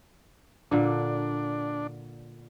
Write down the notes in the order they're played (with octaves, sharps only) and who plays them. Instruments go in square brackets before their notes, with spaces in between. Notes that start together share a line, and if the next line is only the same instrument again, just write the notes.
[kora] A#2 D3 [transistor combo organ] D4